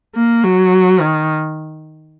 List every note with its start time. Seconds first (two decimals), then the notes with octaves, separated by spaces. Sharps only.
0.16 A#3
0.44 F#3
1.01 D#3